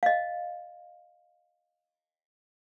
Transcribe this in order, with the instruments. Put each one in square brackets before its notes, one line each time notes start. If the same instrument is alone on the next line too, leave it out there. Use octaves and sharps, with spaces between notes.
[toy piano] D#5 F5